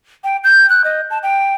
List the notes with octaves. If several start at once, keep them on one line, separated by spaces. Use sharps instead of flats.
G5
G6
F#6
D#5
A5
G5